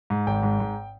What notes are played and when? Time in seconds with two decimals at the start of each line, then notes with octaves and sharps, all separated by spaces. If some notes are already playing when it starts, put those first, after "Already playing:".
0.10 G#2
0.27 G#1 G5
0.43 G#2
0.60 G#2